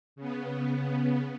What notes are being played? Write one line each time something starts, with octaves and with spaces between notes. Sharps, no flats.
C#3 B3